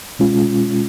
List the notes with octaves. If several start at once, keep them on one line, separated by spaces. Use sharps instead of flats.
B2 G#3 C#4 F4